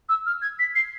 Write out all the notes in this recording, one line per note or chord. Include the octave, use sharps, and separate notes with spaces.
E6
F6
G#6
B6
C7